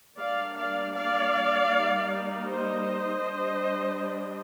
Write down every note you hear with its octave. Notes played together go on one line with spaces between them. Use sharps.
G3 A#3 D4 D5 F5
D5 F5
D5 F5
G3 A#3 D#4
C5 D#5
G3 D4